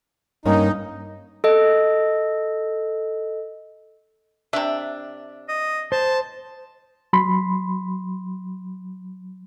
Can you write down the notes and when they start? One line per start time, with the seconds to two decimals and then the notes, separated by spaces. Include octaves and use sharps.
0.45 G2 A#3 C#4 D#4
1.44 A4 D#5
4.53 C3 D4 E5
5.49 D#5
5.92 C5 A5
7.13 F#3 B5 C6